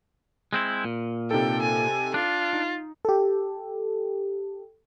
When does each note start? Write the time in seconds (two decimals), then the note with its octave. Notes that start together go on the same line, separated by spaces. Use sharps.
0.53 G#3 C4 E4
0.84 A#2
1.31 C3 D#4 A4 G5
1.62 G#5
2.14 D4 F4
2.53 D#4
3.05 G4 A4